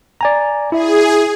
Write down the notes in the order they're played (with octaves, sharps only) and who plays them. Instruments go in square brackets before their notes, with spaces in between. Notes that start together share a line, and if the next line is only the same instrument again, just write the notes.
[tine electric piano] D5 G#5 A#5
[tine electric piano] E4 E5 [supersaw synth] G#4